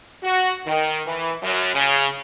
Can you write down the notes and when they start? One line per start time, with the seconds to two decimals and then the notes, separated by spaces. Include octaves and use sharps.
0.23 F#4
0.66 D#3
1.07 E3
1.42 F#2
1.74 C#3